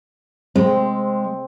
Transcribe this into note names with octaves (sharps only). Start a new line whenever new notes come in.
G#3 C4